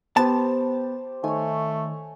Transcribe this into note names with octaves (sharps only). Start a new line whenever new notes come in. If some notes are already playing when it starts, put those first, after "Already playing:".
B3 G4 C5 A5
D#3 A3 C#5 G#5